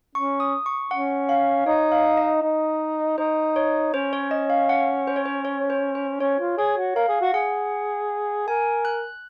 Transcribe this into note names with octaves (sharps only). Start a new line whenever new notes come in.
C#4 C#6
D#6
C#6
C#4 F#5
F5
D#4 C#5
F5
D#5
D#4
D#4 C5
C#5
C#4 C5
C#5
D#5
F5
F#5
C5
C#5
C5
C#5
C5
C5
C#4 C#5
F4
G#4 C#5
F#4
A#4 F5
G#4
F#4
G#4 F#5
A#4 G#5
F#6